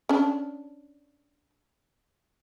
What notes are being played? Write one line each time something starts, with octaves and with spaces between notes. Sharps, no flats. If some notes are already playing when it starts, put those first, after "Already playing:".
C#4 D4